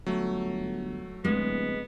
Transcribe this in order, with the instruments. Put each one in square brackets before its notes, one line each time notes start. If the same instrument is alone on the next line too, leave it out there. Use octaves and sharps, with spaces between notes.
[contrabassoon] G1 [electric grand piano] F#3 A3
[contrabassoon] D1 [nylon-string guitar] G#3 [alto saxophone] B3